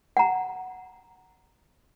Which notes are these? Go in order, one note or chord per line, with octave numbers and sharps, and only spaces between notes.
F#5 A#5